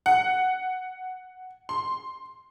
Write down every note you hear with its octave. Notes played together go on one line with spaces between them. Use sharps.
F#5
C6